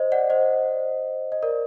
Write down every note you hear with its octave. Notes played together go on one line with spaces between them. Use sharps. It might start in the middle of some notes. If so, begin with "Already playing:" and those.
Already playing: C5 D#5
D5 F#5
C5 D#5
D#5
A#4 D5